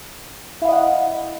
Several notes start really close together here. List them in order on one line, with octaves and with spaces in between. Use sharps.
E4 F5 D#5 F#5